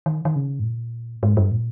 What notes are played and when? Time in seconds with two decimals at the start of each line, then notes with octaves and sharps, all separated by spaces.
0.06 D#3
0.25 D#3
0.36 C#3
0.60 G#2
0.64 A#2
1.23 G#2
1.37 G2
1.52 A#2